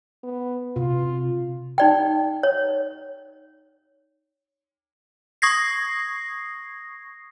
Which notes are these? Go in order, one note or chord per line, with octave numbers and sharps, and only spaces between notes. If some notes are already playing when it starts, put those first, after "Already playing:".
B3
C3 F4
D#4 D5 G5
C#5
C#6 D#6 G#6 A#6 C7